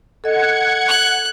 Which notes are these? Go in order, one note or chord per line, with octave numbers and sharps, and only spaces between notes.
A4 D#5 F#5 G#6 C#7
F#6